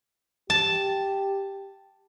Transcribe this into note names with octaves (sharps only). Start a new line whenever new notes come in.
G4 A5